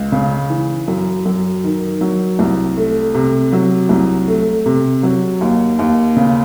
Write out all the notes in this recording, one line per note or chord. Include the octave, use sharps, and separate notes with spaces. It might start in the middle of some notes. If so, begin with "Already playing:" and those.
Already playing: C#2
C#3
E3
F#2
F#2
D#3
F#3
C2
A3
C3
F#3
C2
A3
C3
F#3
D#2
D#2
C#3